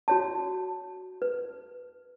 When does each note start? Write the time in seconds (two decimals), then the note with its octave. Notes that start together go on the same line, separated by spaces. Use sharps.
0.08 F#4 C#5 A5
1.22 B4